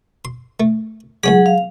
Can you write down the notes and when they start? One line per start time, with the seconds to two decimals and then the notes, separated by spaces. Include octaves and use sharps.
0.25 C6
0.60 A3
1.23 C#2 F#3 C#4 G#4 F#5 D6
1.46 F5